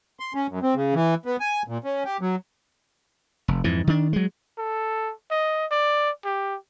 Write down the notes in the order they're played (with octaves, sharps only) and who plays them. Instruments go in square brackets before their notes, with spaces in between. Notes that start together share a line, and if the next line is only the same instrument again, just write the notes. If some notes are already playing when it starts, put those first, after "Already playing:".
[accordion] C6
C#4
F#2
C4
C#3
E3
B3
G#5
A#2
C#4
G4
F#3
[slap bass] F1
F2 G#2 E3
D#3 D4
F#3 G#3
[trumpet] A4
D#5
D5
G4